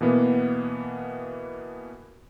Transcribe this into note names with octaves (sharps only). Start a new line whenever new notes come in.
B2 E3 A#3 B3